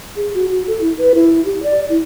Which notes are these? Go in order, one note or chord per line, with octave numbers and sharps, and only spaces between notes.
G#4
F#4
F#4
A4
E4
B4
E4
G4
D5
E4